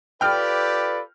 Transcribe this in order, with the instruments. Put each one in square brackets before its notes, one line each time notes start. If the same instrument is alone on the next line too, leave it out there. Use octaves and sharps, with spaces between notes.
[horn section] F4 A4 B4 [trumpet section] G4 D5 [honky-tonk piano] G5 F6